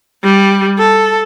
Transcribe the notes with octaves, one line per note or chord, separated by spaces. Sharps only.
G3
A4